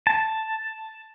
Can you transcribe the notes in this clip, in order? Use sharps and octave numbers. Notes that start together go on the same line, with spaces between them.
A5